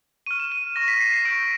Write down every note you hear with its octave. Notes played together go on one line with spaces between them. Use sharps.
C#6 F6 D#7
E7
D#7
C#6 F6 A#6
B6
C7
C7
C#6 E6 G6 D7